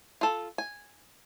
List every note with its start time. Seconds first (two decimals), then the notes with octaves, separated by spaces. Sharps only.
0.21 F4 A4
0.58 G#5